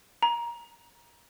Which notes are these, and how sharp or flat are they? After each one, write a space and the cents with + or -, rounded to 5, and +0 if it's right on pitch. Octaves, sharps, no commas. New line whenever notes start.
A#5 +20